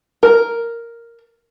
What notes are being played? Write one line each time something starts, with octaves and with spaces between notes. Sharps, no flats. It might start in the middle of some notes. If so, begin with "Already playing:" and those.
A#4